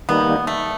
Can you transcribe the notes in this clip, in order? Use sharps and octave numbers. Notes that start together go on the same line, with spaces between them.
D#3 G3 A#3 B3 D#4
A3